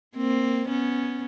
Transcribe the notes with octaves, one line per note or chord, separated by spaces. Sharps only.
A#3 C4
B3 C#4